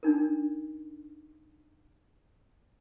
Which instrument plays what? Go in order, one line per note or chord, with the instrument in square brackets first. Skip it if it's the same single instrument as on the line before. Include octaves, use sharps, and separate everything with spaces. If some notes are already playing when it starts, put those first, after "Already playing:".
[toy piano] D4 D#4 A#4